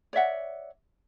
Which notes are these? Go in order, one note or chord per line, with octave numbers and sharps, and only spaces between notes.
C#5 D5 E5 F#5